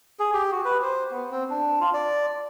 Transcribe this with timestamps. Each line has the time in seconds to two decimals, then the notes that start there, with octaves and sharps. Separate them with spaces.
0.19 G#4
0.33 G4
0.52 F#4
0.65 B4
0.82 C5
1.11 B3
1.31 C4
1.50 D4
1.81 F4
1.94 D5